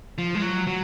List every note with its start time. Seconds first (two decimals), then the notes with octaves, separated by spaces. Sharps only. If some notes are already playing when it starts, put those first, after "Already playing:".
0.18 F3
0.35 G#3
0.42 F#3
0.67 F#3